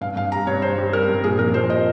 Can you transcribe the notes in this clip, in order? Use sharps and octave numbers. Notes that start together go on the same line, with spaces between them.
G2 F5
G2 F5
G3 A#5
G2 C#5
G3 C5
G3
G3 A#4
G2
A#2 G#4
F3 A#4
F3 C5
A#2 D#5